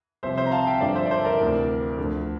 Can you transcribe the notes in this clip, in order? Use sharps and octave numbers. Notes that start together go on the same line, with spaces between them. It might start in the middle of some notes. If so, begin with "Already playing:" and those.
C2 C3 F3 C5 E5
C5 E5
A#5
F5 A5
E5 G5
G2 D3 F3 D5 F5
C5 E5
D5
A4 C5
E5
A#4 D5
D2 C3 E3
D2 D3 F3